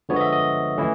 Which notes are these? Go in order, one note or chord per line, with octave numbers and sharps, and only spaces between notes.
D3 F3 G#3 B3 C#5
D#5
E5
D#5
E3 A3 C#4 E4